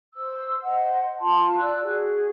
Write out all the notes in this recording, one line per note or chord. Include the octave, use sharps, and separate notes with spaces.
C5 E6
C5 D#5 F#5
F4 A5 C6
D5 E6 F#6
F#4 G#4